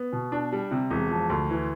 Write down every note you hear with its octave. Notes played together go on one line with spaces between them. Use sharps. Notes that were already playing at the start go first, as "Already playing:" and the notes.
Already playing: B3
B2
D4
G3
C3
E1
F3
D2
E3